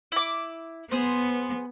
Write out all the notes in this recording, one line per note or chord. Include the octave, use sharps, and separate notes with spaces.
E4 D6
B3 G#4 C5